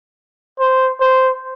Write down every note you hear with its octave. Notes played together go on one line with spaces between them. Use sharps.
C5
C5